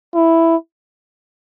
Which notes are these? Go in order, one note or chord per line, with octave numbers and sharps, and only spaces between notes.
E4